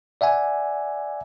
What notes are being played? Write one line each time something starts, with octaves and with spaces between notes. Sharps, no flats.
D5 E5 F#5 G#5